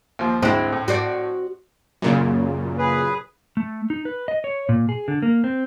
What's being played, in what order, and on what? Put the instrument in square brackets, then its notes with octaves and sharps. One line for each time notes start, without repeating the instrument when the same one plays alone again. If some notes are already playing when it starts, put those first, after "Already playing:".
[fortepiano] D#2 F3 C5
[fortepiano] D2 G#2 F#6 [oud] C4 E4
[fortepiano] A2
[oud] F#4 C5 D5
[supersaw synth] F#2 A#2 C#3
[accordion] G#4 B4
[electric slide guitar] A3
D#4
B4
D#5
C#5
A#2
G#4
D3
A#3
C4